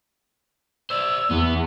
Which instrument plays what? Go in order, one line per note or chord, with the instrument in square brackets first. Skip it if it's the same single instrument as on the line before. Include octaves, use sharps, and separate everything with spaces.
[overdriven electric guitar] C5 D5 [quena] E6
[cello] E2 [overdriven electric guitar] B3